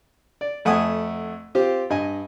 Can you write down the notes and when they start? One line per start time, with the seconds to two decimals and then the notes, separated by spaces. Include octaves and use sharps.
0.41 D5
0.65 F2 A3 F#5 G#5 D#6
1.55 C4 F4 G4 C5
1.90 G2 D#5 G#5